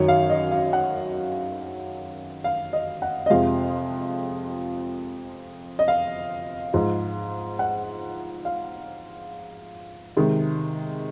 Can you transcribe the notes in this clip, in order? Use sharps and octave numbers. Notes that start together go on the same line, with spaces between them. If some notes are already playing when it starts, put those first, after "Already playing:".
Already playing: F#2 D#3 F#3 C#5
F5
D#5
F5
F#5
F5
D#5
F#5
D#5
F2 C3 F3 G#3 F5
D#5
F5
G#2 F3 G#3
F#5
F5
C3 D#3 G#3